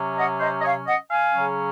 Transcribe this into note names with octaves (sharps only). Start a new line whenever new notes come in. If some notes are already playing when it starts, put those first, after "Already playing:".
Already playing: C3 F#3 C#4
D#5 F#5
C5 D#5
D#5
C#5 F5
D#5 F#5
F5 G#5
C#3 F#3 C#4